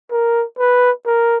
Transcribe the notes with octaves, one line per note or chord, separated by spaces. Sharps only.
A#4
B4
A#4